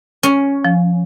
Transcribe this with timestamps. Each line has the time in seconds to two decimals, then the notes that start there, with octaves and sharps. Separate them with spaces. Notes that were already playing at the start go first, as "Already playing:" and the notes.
0.23 C#4
0.65 F3